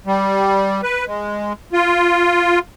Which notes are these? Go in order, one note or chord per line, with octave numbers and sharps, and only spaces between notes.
G3
B4
G#3
F4